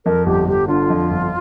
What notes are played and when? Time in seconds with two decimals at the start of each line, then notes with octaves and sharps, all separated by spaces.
0.05 F2 A#4
0.26 G1 G4
0.47 G1 G4
0.68 D3 F4
0.90 F2
1.11 G1